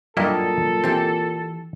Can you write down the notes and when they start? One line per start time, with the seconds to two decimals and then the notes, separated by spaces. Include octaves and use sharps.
0.17 G2 A#2 F#3 A#3 E4 A4 A#4 D#5
0.84 E3 C4 G4